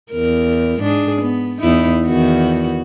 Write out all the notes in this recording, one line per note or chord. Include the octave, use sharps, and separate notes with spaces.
E2 A#4
G#2 D4 G#4
B3
E2 D#4 E4
E2 D#3 F#4